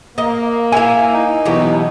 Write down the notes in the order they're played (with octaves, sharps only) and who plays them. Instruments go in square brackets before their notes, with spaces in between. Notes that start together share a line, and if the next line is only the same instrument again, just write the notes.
[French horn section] A#3 [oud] D#5
[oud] E4 F5 [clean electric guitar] G#5
[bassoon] D#4
[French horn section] B2 [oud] E3 F#3 G4